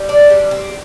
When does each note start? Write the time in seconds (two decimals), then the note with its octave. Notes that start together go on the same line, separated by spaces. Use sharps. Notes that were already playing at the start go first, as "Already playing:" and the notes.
Already playing: G3
0.09 D4
0.30 G3
0.51 C4